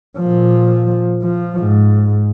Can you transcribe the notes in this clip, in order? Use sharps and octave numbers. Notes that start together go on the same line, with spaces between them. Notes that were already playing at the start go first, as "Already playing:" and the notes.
A#2 F3
F3
G#2